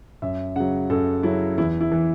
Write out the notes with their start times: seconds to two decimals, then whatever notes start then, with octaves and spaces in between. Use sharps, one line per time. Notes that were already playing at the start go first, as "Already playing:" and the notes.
0.22 F#2 E5
0.56 C#3 F#3 F#5
0.90 F#2 A4
1.23 C#3 F#3 E4
1.58 E2 E4
1.81 E4
1.92 E3